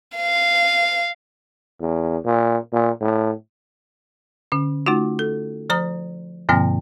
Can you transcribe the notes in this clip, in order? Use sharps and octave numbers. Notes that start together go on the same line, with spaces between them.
F5
E2
A#2
A#2
A2
D3 C#4
A3 D#4 F4 F#4
A4
F3 C5 A#5 D#6
G2 B2 D3 F3 A#3 C4